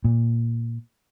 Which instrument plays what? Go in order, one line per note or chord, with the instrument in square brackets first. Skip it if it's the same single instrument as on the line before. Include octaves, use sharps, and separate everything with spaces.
[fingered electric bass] A#2